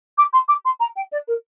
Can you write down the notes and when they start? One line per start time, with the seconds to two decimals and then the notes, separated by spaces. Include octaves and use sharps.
0.17 D6
0.33 C6
0.48 D6
0.65 C6
0.79 A#5
0.96 G5
1.11 D5
1.27 A#4